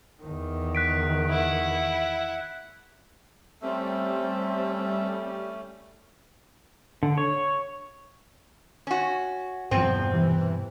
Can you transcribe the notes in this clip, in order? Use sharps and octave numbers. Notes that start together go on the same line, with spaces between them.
E2 D#3
F#6 B6 D7
E4 F#5
G3 A3 C4 C#4 A4 E5
D3
C#5
C#4 F#4
E2 G2 B2 F3 C4
C3 E3